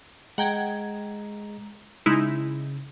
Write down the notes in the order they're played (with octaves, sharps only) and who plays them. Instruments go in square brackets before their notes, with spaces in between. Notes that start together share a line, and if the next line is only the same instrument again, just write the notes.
[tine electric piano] G#3 A#5 [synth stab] F#5 G5 G#6
[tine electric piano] C#3 [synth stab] G#3 D#4 E4